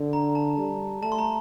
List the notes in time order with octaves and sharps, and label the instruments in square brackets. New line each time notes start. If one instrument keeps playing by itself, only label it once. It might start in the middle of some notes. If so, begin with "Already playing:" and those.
Already playing: [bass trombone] D3
[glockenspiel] A#5
A5
[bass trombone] G3
[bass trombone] A3 [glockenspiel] A5
[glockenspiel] C6
A#5